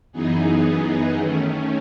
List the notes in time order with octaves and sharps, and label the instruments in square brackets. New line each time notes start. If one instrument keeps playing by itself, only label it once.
[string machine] F#2 E3 B3 D#4 G#4
D#3 A3 C#4